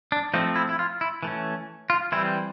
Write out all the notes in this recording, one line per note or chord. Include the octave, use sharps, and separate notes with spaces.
D4
F3 A3 C4 D#4
E4
E4
F4
E4
E3 A3 C#4
F4
E3 G3 C4 E4